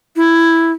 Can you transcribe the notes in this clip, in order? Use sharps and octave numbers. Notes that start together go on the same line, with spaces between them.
E4